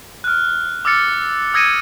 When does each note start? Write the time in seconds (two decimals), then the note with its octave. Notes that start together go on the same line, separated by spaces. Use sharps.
0.24 F6 F#6
0.85 D6 E6 F6 A6 C#7
1.54 D#6 E6 G#6 A#6 C#7 D#7